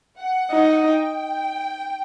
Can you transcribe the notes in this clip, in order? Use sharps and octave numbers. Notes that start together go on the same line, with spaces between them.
F#5
D#4
G5